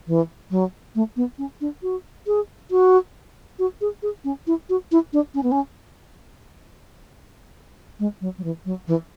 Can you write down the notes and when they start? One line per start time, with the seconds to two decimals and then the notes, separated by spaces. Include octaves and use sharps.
0.07 E3
0.51 F#3
0.95 A3
1.16 B3
1.38 C#4
1.61 D4
1.83 F#4
2.27 G#4
2.71 F#4
3.59 F#4
3.81 G#4
4.03 G#4
4.24 C#4
4.47 E4
4.69 F#4
4.92 E4
5.13 D4
5.34 C#4
5.43 B3
5.52 C#4
7.99 G#3
8.21 F#3
8.38 F#3
8.44 E3
8.65 F#3
8.87 E3